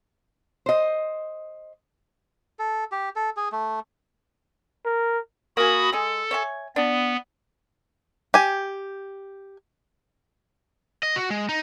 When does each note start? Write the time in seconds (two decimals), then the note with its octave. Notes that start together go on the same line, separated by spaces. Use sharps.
0.66 C5 D#5
2.59 A4
2.92 G4
3.16 A4
3.37 G#4
3.52 A3
4.85 A#4
5.57 A#3 F#4 G#5 B5 D#6
5.93 G#3 G#4 A4
6.31 C#5 E5 G#5
6.76 B3 D4
8.34 G4 G#5
11.03 D#5
11.16 F#4
11.30 G#3
11.49 D#4